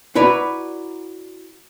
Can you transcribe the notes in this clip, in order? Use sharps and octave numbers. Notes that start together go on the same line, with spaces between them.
E4 F#4 B4 D5 A#5